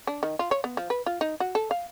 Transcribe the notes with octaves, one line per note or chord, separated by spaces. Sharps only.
D4
D#3
F4
C#5
B3
F3
B4
F4
D#4
F#4
A4
F5